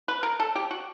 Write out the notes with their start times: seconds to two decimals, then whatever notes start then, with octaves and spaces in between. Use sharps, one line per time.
0.08 B4
0.23 A#4
0.40 A4
0.55 G4
0.71 F#4